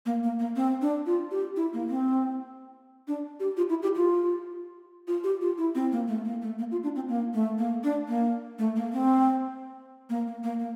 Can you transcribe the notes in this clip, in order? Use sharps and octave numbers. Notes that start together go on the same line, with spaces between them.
A#3
A#3
A#3
C4
D4
F4
G4
E4
A#3
C4
D4
G4
F4
E4
G4
F4
F4
G4
F4
E4
C4
A#3
A3
A#3
A3
A#3
F4
D4
C4
A#3
A3
A#3
D4
A#3
A3
A#3
C4
A#3
A#3
A#3
A#3